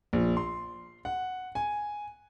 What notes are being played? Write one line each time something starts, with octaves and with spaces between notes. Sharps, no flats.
A#1
C6
F#5
G#5